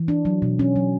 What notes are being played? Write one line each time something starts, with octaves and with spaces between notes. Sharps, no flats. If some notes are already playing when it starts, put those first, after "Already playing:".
Already playing: E3
D4
F#3
B2
C#4
F#3